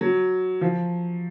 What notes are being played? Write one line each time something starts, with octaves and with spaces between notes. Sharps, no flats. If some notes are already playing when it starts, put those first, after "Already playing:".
F#3
F3